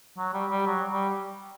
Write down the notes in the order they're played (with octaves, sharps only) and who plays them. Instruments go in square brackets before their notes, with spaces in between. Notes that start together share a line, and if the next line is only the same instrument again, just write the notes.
[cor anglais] F#3
G3
G3
F#3
G3